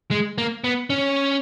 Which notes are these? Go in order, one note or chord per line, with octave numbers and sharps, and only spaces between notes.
G#3
A#3
B3
C#4